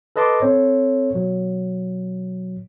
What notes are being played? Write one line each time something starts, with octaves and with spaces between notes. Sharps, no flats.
A4 B4 D#5 A5 C6 D6
C4 A4 C5 C#5
B2 F#3